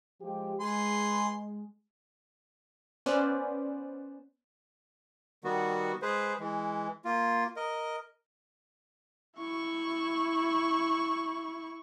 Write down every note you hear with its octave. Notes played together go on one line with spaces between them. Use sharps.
F3 G#3 G4
G#3 G#4 B4 C6
B3 C#4 B4 C5 D5
D#3 G3 B3 F#4
G#3 G#4 B4 C5
E3 G#3
A#3 F4
A#4 D#5
E4 C#6